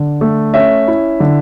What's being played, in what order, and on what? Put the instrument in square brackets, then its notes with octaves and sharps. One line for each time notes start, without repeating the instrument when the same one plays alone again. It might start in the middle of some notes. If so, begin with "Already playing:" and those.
Already playing: [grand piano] D3
A3
C#4 E5
E4
D3